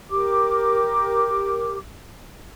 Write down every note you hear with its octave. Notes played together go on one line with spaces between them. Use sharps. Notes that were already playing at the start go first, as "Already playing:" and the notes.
G4 A#4 D6